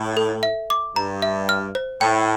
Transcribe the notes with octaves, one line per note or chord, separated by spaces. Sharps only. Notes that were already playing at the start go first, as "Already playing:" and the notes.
Already playing: A2
A4
E5
D6
G2 A#5
E5
F6
C5
A2 G5